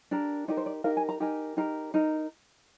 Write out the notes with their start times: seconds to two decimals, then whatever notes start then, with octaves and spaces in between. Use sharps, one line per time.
0.11 D4 G4 A#4
0.48 D#4 G4 A#4 D5
0.57 C5
0.66 D5
0.84 D#4 G4 A#4 F5
0.97 G#5
1.09 A#5
1.20 D#4 G4 A#4 G#5
1.57 D#4 G4 A#4
1.94 D#4 A#4